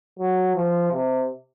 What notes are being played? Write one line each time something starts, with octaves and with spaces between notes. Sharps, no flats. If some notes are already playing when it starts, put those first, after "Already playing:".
F#3
F3
C3